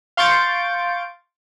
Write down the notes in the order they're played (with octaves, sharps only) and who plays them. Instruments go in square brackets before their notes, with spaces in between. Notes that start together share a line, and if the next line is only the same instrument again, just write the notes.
[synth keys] F5 C6 C#6 G6 A6 D7